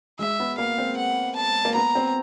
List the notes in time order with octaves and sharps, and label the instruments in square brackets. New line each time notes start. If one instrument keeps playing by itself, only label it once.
[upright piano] G#3 [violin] E5
[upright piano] B3
[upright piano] A#3 [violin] F5
[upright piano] C4
[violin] F#5
A5
[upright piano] A#3
[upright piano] B3 [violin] A#5
[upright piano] C4